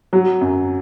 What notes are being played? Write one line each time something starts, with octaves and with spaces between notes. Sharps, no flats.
F#3
F#2